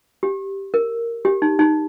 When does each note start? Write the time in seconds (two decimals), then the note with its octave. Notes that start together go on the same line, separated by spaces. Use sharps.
0.23 G4
0.74 A#4
1.25 G4
1.42 D#4
1.59 D#4